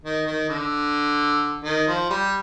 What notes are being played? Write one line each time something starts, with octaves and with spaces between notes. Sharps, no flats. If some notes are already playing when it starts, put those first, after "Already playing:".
D#3
D#3
D3
D#3
F3
G3